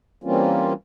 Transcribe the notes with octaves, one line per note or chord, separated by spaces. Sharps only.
E3 G3 A#3 C4 C#4 F4